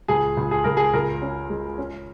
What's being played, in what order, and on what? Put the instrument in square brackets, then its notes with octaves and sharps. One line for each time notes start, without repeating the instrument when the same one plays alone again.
[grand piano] C#2 G#4
C#2
G#4
C#2 A#4
G#4
C#2 A#4
C#4
G#3
C#4